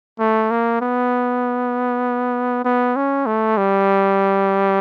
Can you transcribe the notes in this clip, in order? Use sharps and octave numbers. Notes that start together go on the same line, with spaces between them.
A3
A#3
B3
B3
C#4
A3
G3